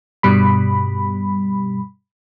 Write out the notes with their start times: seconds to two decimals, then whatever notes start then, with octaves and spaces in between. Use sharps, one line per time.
0.23 G2 B2 G3 B5